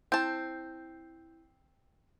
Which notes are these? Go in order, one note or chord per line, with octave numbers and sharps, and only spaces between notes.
C4 E4 A5 G6